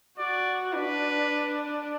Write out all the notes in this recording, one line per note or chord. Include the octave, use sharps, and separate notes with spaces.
F#4 D5
D4 B4